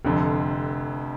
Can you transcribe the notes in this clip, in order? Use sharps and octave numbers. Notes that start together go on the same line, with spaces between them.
F1 F2 D3